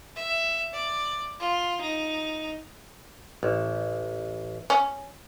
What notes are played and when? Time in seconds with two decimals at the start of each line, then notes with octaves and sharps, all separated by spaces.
0.15 E5
0.73 D5
1.39 F4
1.81 D#4
3.43 A1
4.70 C#4